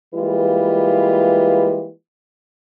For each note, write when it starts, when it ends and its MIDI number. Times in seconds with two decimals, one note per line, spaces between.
0.15 1.90 52
0.15 1.90 55
0.15 1.90 56
0.15 1.90 58
0.15 1.90 65
0.15 1.90 71